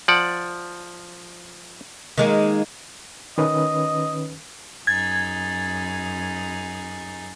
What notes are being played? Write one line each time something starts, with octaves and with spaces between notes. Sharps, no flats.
F3 D5 F#5
D#3 G#3 A#3
D#3 C#4 B4 D#5
F#2 D#4 G#4 G#6 A6